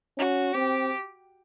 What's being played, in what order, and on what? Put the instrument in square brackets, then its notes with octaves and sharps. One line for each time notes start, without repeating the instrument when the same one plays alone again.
[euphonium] C#4 [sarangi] F#4
[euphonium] C4 [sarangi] G4